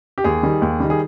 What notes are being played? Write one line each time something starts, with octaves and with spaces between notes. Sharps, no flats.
G4
D#2 G#4
D#3 G3
D#2
D#3 G3
G#4